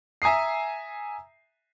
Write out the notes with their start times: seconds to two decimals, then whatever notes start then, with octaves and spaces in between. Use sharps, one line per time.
0.22 E5 G#5 A#5 D#6 C7